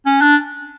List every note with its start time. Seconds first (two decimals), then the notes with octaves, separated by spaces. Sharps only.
0.06 C#4
0.21 D4